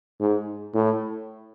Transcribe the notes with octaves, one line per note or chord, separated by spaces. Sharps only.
G#2
A2